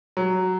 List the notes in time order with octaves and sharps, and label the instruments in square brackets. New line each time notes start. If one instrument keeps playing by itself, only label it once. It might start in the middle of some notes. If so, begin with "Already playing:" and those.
[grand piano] F#3